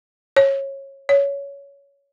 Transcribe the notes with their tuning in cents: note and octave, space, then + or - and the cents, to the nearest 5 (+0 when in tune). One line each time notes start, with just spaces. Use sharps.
C#5 -20
C#5 +15